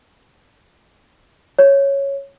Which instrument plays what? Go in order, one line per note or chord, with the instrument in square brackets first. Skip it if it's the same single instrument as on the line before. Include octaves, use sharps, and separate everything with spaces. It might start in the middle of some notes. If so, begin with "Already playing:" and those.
[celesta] C#5